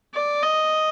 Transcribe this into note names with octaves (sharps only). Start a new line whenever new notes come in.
D5
D#5